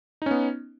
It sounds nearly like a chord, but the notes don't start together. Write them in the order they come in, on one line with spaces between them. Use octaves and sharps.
D#4 C#4 B3